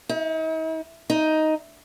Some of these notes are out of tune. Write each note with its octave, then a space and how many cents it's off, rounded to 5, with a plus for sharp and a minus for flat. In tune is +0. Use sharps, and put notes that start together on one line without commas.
D#4 +45
D#4 +5